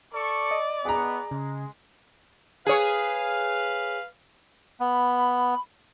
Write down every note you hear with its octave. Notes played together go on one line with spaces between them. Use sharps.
A4 D5 C#6
D#5 D#6
B3 G#4 A#5
C#3 G#3
G#4 B4 C#5 F5
B3 B5